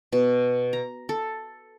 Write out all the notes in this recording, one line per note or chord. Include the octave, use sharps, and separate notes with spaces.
B2
A#5
A4